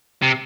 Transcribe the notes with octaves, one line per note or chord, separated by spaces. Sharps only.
C3